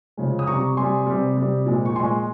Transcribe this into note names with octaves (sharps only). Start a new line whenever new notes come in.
C#3 F3 G#3
D#6
C3 G3 A#5 C#6
C3 G3 G#5 C6
C3 G3
C3 G3
A#2 F3 G#3
C#6
A#2 F3 G#3 G#5 C6